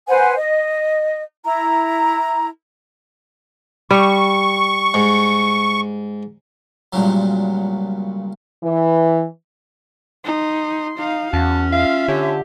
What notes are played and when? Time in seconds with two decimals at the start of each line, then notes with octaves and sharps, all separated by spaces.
0.07 B4 C5 F#5 G#5
0.37 D#5
1.44 E4 A#5
3.91 G3 C#6
4.94 G#2
6.93 C#2 G2 A#2 C#3 F#3
8.64 E3
10.25 D#4 C6
10.98 D#4 F5
11.33 E2 C#4 F#4 A5
11.72 F4 E5 F5
12.08 D3 C#4 G4